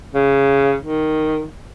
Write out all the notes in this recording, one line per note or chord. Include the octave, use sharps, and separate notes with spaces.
C#3
D#3